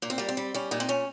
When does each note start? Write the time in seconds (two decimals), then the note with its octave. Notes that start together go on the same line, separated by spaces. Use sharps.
0.02 A#2 A#3
0.10 C4
0.18 G3 A#3
0.29 C4
0.37 G3
0.54 G3 C#4
0.71 A#2 D#4
0.80 C4
0.89 A#2 C#4